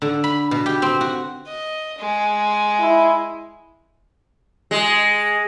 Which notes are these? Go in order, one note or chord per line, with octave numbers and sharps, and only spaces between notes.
D3
B5
B2
G4
C4
F#4
D#5
G#3
E4
G#3